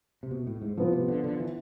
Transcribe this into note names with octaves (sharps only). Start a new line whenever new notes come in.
C3
B2
A2
G#2
A2 F3 B3 F4
C3
D3
D3
E3